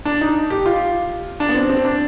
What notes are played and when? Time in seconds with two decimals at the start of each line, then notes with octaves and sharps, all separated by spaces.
0.05 D4
0.21 D#4
0.50 G4
0.66 F4
1.40 D4
1.49 B3
1.55 C4
1.70 C4
1.85 D4